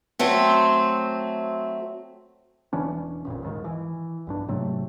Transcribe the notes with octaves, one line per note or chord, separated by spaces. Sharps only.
F#3 A3 C4
E1 E3 C#4 D4
A1 F2 A#2
D#2 G#2 D#3
E3
B1 G2 D4
G#2 C3 F#3 A3